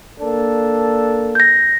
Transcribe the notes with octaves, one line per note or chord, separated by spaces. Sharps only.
A#3 D4 A4
G6 A#6